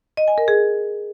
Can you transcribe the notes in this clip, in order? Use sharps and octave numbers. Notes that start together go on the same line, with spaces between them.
D#5
G#5
A#4
G#4